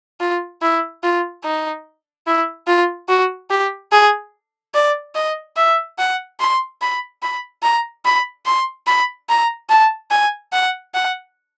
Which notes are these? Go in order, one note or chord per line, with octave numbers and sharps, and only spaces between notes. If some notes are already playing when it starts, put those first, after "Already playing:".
F4
E4
F4
D#4
E4
F4
F#4
G4
G#4
D5
D#5
E5
F#5
C6
B5
B5
A#5
B5
C6
B5
A#5
A5
G#5
F#5
F#5